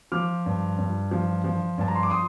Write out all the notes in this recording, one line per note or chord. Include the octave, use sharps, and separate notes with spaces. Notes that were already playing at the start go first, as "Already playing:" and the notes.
F3 D6 F6
G2
G2
F3
F3
G2 A5
A#5
C6
D6
C6 D#6